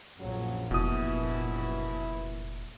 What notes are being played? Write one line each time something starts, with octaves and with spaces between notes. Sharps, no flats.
A#1 F#2 C#3 F3 F#3
F1 B2 E3 E4 D#6